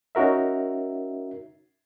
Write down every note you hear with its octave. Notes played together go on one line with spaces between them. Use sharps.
C#4 D#4 F#4 A#4 E5